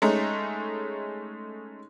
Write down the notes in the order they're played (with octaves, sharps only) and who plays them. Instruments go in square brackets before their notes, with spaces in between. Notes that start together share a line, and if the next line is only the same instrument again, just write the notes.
[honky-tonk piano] G#3 A3 C#4 D#4